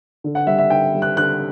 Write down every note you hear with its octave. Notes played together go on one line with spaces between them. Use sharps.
D3
F#5
G3 E5
E5
D3 G5
G3
F#6
D3 F#6